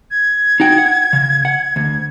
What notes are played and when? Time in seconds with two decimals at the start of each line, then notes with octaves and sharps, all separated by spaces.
0.10 G#6
0.60 D#4 F#4 G5
0.78 F#5
1.13 C#3
1.45 F#5
1.76 D2